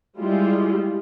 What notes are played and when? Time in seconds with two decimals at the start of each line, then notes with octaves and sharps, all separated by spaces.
0.18 G3 G#3 E4 F4